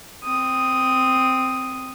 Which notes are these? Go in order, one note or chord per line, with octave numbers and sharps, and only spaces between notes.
C4 D#6